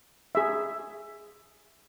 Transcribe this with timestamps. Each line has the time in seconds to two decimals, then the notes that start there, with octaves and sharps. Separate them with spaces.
0.35 G#4 E5